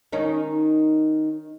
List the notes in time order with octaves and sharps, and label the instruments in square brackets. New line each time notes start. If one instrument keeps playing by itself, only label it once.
[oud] D#3 C#4 D#4